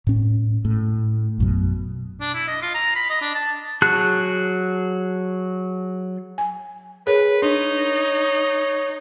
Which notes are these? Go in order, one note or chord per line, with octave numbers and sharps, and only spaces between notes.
A2 C#4
A2
A#1 F#2 B2
D4
E4
D#5
F4
A#5
B5
D#5
D4
A5
F#3 F#4 G#4 A5 F#6
G#5
G#4 A#4 B4 C#5
D4 D#4 C#5